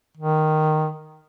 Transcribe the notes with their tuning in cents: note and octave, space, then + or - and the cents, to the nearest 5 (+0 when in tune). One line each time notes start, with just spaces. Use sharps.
D#3 -5